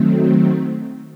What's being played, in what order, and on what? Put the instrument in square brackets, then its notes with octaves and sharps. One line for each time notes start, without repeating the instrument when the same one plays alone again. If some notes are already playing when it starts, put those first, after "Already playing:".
Already playing: [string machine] D#3 F#3 A3 C4